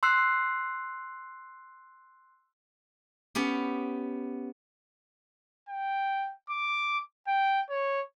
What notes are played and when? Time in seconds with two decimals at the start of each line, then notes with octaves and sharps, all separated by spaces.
0.03 C6 E6 F#6 C7
3.35 B3 C#4 G4
5.69 G5
6.49 D6
7.27 G5
7.69 C#5